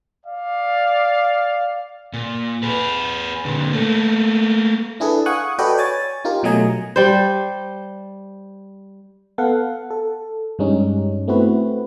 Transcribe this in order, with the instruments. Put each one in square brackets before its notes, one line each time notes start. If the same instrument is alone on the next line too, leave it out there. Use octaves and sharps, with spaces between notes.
[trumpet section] D5 F5
[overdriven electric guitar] A#2
G#4 B4
A#2 D3
A3 A#3
[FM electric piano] D4 E4 G#4 A4 B4
F5 F#5 G#5 C#6 D#6 F#6
F#4 A4 B4 D5 D#5 G5
C#5 G#5 A6
D#4 F4 G4 A#4
B2 F#3 A3 D#5 G#5 A#5
[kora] G3 C5
[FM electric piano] B3 A4 F5 F#5
A4
G2 G3 G#3 C#4 D#4
A3 B3 C4 E4 F#4 B4